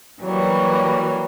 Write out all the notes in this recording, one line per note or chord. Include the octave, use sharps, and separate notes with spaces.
E3 F#3 G3 A#3